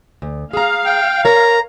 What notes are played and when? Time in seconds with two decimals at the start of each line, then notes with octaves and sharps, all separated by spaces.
0.22 D2
0.53 G#4 F5 A#5
0.85 G5
1.25 A#4 C#5 A#5